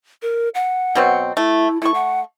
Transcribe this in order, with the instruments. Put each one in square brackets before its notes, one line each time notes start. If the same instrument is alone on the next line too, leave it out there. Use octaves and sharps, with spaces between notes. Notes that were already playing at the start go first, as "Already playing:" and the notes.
[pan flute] A#4
F#5
[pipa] B2 F#3 C4
[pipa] A3 [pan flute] E4
[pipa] A3 C#6 [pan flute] E4
[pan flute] F#5